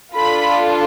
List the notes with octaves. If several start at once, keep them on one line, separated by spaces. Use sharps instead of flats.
D4 F4 A4 B5